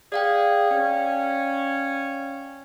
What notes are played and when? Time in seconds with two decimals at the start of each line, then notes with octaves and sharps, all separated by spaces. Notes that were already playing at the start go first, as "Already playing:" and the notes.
0.12 G#4 D5 F5 G5
0.71 C#4